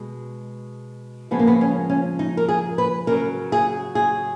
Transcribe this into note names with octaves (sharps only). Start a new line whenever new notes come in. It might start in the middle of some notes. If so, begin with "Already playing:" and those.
Already playing: B2 G#3
C#3 F3 G#3 B3
A#3
B3
C#4
C#4
D#4
A#4
G#4
B4
C#3 F#3 A#4
G#4
G#4